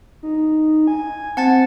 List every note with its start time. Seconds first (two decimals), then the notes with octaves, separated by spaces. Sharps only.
0.23 D#4
0.87 G#5
1.37 C4 F#5 A5 A6